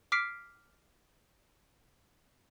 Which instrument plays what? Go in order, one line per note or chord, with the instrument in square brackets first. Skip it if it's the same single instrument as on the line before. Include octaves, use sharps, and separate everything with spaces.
[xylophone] D6 F6 B6 C7 D7